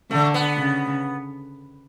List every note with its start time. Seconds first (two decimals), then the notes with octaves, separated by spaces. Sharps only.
0.11 D3 A3
0.34 B3
0.57 C#3